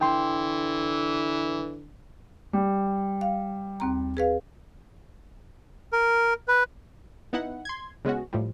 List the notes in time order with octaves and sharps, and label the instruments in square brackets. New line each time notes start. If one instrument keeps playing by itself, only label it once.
[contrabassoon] D3 [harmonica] E3 [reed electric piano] G5 C6
[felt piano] G3
[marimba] F5
D#2 C4 A#5
G#4 B4 F5
[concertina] A#4
B4
[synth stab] B3 D#4 E4 F#5
C6 G#6
C#3 G#3 B3 C#4 F#4
A2 F3 G3